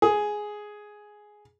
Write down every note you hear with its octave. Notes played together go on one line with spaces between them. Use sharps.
G#4